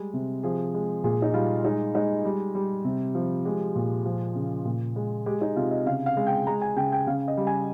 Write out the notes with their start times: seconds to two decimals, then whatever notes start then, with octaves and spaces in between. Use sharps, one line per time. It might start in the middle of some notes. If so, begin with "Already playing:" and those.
Already playing: G3 G#3
0.14 C3
0.43 F3 G#4
0.74 G#3
1.04 A#2 G#4
1.22 D#4
1.34 G3 F4
1.64 G#3 D#4
1.95 G#3 D#4
2.25 G3
2.55 G3
2.85 C3
3.15 F3
3.45 G#3 G4
3.76 A#2
4.05 F3
4.35 C#3
4.65 A#2
4.96 G#3
5.26 G#3 G4
5.41 D#4
5.56 C3 F4
5.71 D#5
5.86 C#3 F5
6.06 F5
6.17 G#3
6.26 G5
6.47 G#3 A#5
6.61 G#5
6.76 C#3 G5
6.92 G5
7.07 C#3 F5
7.28 D#5
7.37 G3
7.47 G#5